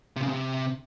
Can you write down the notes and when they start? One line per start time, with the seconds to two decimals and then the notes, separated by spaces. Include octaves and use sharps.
0.16 C3
0.22 C#3
0.29 C3